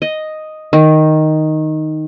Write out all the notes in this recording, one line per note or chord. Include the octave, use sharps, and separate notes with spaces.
D#5
D#3